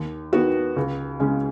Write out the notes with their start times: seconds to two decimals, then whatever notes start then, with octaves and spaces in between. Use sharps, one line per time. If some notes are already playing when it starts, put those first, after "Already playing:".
Already playing: D#2
0.33 D#3 B3 F#4
0.76 C#2
1.20 C#3 G#3 C#4